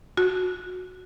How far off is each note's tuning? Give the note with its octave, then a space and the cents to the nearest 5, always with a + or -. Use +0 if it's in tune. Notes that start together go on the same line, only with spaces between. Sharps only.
F#4 -15